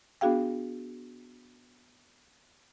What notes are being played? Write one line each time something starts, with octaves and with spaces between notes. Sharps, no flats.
B3 D4 F#4 G#4 F5 G5